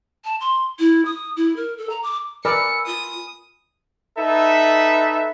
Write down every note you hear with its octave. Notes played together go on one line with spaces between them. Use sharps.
A5
C6
E4
D#6
E4
A#4
A4
A#5
D6
A#4 B4 D5 G#5 B5 E6 F6 C#7
F4 D#6
D#4 A4 B4 E5